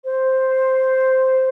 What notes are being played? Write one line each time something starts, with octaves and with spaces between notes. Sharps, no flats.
C5